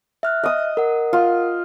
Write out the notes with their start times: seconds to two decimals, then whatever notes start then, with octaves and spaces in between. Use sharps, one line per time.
0.23 E5 F6 F#6
0.44 D#5 D#6
0.77 A#4 F#5
1.13 F4